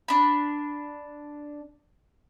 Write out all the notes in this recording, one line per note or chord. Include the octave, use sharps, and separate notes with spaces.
D4 B5